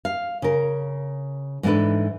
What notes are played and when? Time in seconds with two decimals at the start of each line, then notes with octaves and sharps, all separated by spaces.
0.05 F5
0.42 C#3 A#4
1.63 G#2 E3 B3 D4 A4 B4